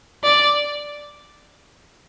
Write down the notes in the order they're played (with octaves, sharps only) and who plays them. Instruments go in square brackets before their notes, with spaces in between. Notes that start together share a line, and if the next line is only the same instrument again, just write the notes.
[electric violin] D5